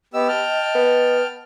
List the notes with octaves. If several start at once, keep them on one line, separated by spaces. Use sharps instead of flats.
B3 G4 D#5 E6
G5 A5 F6
B3